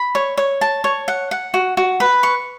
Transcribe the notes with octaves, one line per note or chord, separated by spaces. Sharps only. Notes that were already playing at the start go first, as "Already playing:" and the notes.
Already playing: B5
C#5
C#5
A5
C#5
F#5
F#5
F#4
F#4
B4
C#6